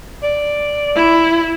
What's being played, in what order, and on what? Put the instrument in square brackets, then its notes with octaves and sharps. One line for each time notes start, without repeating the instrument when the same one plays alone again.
[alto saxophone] D5
[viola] E4